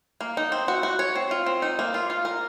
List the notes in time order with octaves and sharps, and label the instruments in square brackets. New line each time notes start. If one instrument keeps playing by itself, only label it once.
[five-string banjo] A#3
D#4
C4
F#4
F#4
C#5
C4
F4
C4
D#4
A#3
F4
F4
A#4